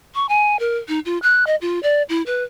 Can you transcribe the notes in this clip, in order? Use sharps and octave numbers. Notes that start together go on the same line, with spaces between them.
C#6
G#5
A#4
D#4
F4
F#6
D#5
F4
D5
E4
B4